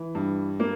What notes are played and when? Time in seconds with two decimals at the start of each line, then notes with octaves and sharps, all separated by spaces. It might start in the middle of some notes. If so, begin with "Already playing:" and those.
Already playing: E3
0.15 G2
0.60 A#3